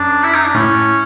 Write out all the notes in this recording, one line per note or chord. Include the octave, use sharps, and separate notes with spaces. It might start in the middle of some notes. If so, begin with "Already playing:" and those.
Already playing: F#2 D4
E4
D#4
D4
A2 C#4